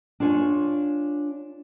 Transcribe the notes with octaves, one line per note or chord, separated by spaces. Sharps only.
D4 F4 C#5 G#5